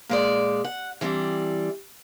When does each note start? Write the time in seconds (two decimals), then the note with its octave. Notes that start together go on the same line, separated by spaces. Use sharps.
0.09 A#2 G#3 D5
0.64 F#5
1.01 E3 G3 C4 D4